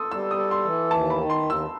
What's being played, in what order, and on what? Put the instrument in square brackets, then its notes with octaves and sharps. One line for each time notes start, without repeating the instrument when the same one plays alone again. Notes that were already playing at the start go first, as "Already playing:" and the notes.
Already playing: [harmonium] A4 [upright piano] C6 D#6
[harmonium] G3 [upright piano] E6
[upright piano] D#6
[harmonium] A4
[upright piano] C6
[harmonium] E3
[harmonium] D#2 [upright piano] A5
[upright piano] B5
[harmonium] D#3
[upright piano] C6
[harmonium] D#2
[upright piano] E6